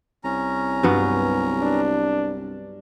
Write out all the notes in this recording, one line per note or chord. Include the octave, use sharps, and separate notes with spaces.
C2 C#4 A#5
G2 F#3 B3
D4